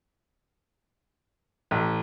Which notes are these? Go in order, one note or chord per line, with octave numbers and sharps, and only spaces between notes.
A1